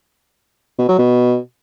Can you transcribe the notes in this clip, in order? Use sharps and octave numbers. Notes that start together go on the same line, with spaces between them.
B2
F#3
B2